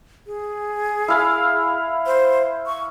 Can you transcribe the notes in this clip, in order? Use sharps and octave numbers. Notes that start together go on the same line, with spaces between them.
G#4
E4 F5 B5
C5
C#6